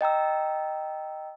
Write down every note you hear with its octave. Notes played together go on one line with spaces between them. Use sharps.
D#5 G5 A#5 E6